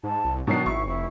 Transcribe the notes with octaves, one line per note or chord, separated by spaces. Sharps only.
G#2 A5
C2
B2 D#3 F#3 D4 C7
G#1 E4 C#6
F1 E4